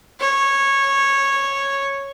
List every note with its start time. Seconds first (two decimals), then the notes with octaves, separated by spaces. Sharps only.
0.20 C#5